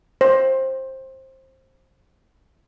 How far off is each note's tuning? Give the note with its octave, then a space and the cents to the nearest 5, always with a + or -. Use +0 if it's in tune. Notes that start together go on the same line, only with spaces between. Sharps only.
C5 +20